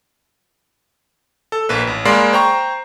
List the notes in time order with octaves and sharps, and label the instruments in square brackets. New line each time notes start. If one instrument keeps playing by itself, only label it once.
[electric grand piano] A4
A#1 A#3 B4
A1
G#3 A#3 D5 F5 B5 C6
C5 G5 A#5 C#6